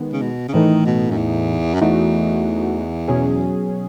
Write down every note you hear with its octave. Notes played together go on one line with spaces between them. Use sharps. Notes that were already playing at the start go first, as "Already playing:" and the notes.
Already playing: D#3 G#3 B3
C#3
B2
C#3
A2 D#3 E3 A3 D#4
B2
F#2
E2
F#2
E2 E3 A3 D#4 F#4
B2 F#3 C#4 G#4